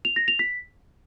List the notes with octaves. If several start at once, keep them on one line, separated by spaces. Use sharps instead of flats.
F7
A#6
F7
B6